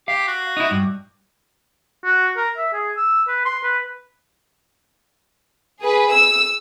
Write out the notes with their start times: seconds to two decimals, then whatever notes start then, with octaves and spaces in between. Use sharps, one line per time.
0.08 G4 F5
0.28 F#4
0.57 D#4 E4
0.71 G2
2.05 F#4
2.37 A#4
2.57 E5
2.73 G#4
2.97 E6
3.28 B4
3.45 C6
3.63 B4
5.81 G#4 B4
6.12 E6